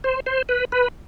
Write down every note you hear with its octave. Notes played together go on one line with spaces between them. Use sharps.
C5
C5
B4
B4